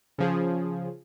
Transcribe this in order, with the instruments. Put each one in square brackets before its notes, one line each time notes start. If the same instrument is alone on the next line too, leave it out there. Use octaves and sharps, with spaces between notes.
[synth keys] C#3 F3 G#4